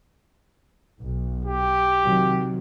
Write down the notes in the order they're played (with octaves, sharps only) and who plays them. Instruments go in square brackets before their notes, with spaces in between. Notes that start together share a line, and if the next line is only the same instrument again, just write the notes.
[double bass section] B1
[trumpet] G4
[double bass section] C3 D#3 F#3